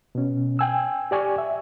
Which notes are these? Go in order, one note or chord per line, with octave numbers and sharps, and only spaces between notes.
B2 C#4
G5 G#5 E6
G4 D5 G#5 C#6
E5